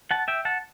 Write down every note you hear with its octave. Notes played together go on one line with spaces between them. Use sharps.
F#5 A5
E5 G5
F#5 A5